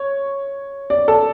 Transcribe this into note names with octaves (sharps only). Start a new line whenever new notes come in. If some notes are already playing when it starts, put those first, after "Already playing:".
Already playing: C#5
D5
A4